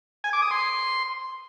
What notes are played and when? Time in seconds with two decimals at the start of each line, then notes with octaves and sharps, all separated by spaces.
0.24 G#5
0.33 D6
0.42 D#6
0.51 C6